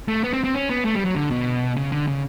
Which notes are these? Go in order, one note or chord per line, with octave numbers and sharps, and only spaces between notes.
A3
B3
C4
C4
C#4
B3
A3
G3
F#3
D3
B2
C#3
D3
C#3